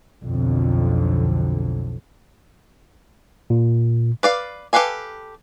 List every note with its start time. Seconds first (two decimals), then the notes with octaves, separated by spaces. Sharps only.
0.23 B1 F2 D3
3.50 A#2
4.23 B4 D5 F5
4.73 G4 A4 B4 F5 G#5